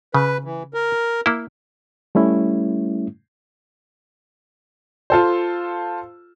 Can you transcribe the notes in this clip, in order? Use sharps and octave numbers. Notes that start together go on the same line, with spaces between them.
C#3 B4
E3
A#4
A#3 E4
G3 A3 C#4 E4
F4 A4 C5